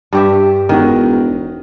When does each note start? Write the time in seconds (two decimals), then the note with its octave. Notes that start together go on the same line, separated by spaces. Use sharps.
0.13 G2 G4 E5
0.69 E1 D#3 F#4